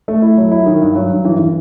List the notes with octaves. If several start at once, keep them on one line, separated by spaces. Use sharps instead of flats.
A3
E4
F#3
E4
D#3
G2
F#3
G2
E3
E3